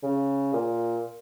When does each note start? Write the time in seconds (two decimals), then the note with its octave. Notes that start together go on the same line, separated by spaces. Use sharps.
0.03 C#3
0.53 A#2